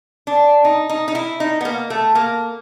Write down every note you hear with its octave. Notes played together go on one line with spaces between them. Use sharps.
D4
D#4
D#4
D#4
E4
D#4
B3
A#3
A3
A#3